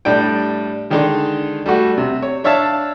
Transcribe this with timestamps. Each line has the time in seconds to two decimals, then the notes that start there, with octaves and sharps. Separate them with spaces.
0.05 A2 G3 D4 G5
0.90 D3 D#3 G#3 D4 D#4
1.66 G3 A3 F#4
1.98 C3
2.23 C#5
2.44 D4 C#5 E5 F5 A5